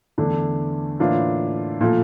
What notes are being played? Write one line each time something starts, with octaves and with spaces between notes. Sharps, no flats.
E2 D3 A3 D4
A2 E3 A#3 D4 F4
A#2 F3 A3